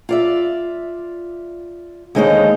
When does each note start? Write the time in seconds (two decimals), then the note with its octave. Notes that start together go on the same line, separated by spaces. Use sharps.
0.09 F4 D5 E5
2.15 D#2 D3 G#3 D#4 C5 C#5